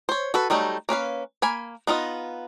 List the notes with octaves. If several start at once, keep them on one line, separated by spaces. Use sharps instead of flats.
C5 C#5
F#4 A4 B4
F#3 G3 A3 D#4
A#3 C#4 B4 F5
A#3 G#5 B5
B3 D#4 F4 D#5